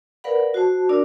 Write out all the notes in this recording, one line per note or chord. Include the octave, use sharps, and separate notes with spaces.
A#4 B4 D5 F5 F#5 B5
F#4 C5 A5
D4 F#4 A#4 D5 E6